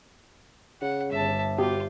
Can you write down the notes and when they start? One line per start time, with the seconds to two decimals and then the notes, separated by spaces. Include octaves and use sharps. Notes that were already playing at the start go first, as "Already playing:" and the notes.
0.82 C#3 F#5
1.11 G1 E5 A5
1.58 B2 F4 G4